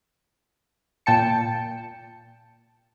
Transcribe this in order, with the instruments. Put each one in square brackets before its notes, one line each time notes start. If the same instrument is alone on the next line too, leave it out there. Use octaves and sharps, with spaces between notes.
[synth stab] A#2 G5 A5 C#7